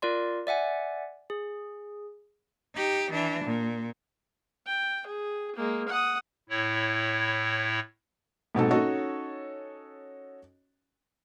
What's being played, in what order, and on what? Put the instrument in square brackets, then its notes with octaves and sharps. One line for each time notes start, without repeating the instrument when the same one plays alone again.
[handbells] F4 A#4 D5 C6
D5 E5 F#5 G#5
G#4
[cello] D#4 G4
E3 D4
A#2
[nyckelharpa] G5
G#4
G#3 A#3
F#5 D#6
[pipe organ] A2 E4 C#5
[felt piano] G#2 B2 C4 A4
C#4 D#4 F#4 A4 C#5 D#5